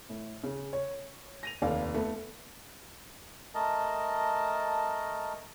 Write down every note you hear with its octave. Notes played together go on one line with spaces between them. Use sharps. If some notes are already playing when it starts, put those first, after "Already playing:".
A2
C#3
C#5
A#6 D#7 F7
F1 D#2 A4 D5 F5
A3 B3
A3 A#4 D#5 A5